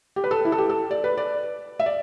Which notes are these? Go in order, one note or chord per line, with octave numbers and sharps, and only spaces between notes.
G4
B4
A4
E4
A4
G4
A4
D5
B4
D5
E5
D5